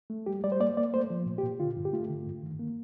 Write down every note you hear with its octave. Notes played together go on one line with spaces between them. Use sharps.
A3
G3 G4
G3 D5
C5
A#3 D5
A#3 D5
A3 C5
F3
A#2
G4
A#2
D3 F4
G2
G4
A3 F4
D3
G2
D#3
A#3